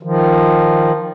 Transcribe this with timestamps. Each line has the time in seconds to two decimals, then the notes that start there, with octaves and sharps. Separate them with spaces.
0.03 D#3 F3